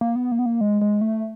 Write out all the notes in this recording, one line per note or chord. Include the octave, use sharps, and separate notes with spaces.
A#3
B3
A#3
B3
A#3
G#3
G#3
A3